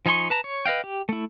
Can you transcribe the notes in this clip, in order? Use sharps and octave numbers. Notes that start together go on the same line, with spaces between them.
F3 D#4 G#5 C6 C#6
B4 A5 A#5
C#5
B4 D#5 F5 G5
G4
A3 E4